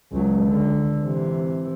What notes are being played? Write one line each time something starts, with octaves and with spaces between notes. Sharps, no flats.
C#2 F#3
D3
C3 E3